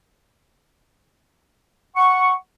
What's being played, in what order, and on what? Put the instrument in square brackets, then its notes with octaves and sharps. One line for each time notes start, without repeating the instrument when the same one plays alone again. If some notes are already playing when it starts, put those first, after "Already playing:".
[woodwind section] F#5 C#6